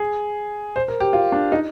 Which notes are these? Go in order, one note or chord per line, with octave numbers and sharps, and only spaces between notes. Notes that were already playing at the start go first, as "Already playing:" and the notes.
Already playing: G#4
C5
A#4
G4
F4
D4
D#4